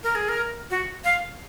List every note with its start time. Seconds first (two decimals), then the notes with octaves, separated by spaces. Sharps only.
0.03 A#4
0.15 G#4
0.29 A#4
0.70 F#4
1.04 F5